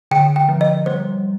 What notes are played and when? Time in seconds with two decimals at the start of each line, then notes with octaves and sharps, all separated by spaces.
0.11 D3 G5
0.36 G5
0.49 F3
0.61 D#5
0.86 G3 C5